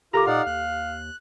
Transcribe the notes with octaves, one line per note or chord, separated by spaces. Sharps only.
F#1 F4 G4 A4 A#4 A#5 D6
A#2 D#4 D5 F5 F#5
D#2 F#6